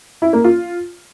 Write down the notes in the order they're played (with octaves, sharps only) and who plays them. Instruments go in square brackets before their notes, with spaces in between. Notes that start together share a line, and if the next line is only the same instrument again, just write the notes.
[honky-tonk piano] E4
A#3
F4